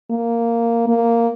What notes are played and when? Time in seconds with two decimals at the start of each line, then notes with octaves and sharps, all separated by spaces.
0.11 A#3
0.88 A#3